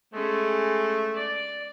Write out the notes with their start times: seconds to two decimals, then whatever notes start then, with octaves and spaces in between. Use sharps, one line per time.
0.13 G#3 A3 C#4
1.15 D5